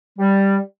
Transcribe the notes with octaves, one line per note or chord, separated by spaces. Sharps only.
G3